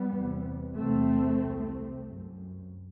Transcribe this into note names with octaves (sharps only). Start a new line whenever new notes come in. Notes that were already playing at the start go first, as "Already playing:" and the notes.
Already playing: G3 B3
E2 C3
E2 C3 A3 C4
C2 C3
F#2